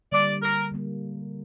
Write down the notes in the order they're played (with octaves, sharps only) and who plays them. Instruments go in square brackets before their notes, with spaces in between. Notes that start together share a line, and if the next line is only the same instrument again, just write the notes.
[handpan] D3 G3 A#3 [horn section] D5
[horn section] A#4
[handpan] D3 G3 A#3